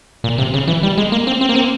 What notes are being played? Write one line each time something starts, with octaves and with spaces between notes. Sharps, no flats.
A#2
C3
C#3
E3
G3
G#3
A#3
C4
C4
A#3
C4